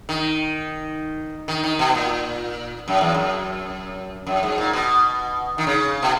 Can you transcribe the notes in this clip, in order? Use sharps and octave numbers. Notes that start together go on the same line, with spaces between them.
D#3
D#3
D#3
B2
A#2
F#2
E2
F#2
F#2
G#2
A#2
B2
D#3
C#3
B2